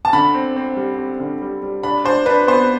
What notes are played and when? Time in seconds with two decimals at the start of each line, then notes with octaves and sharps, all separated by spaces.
0.05 A5
0.13 D3 B5
0.34 C4
0.56 C4
0.76 G3
0.98 C4
1.20 D3
1.42 G3
1.62 G3
1.83 D4 B5
2.05 D4 C5
2.26 D4 B4
2.47 B3 C5